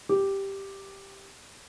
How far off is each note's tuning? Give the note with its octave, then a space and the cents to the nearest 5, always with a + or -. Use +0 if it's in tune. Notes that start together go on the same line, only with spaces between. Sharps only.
G4 +0